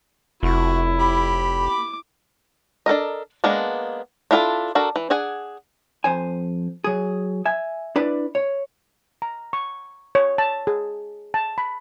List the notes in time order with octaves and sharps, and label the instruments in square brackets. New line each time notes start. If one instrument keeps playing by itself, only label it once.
[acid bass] F1 [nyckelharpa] E4 [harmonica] F#4
[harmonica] G4 B5
[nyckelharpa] D6
[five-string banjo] D4 A4 A#4 D#5
G#3 A#3 B3 D4
D4 E4 F4 G#4 A4
D4 F#4 A4 A#4
E3
D4 G#4 F#5 G#5
[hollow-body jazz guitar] F2 C5 G#5
F#3 G#4
E5 G#5
D4 E4 B4 D5
C#5
[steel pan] A#5
C#6
C#5
A5
G#4
A5
B5